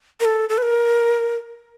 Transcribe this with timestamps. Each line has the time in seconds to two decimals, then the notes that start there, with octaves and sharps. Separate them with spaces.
0.20 A#4
0.25 A4
0.49 A4
0.58 B4
0.62 A#4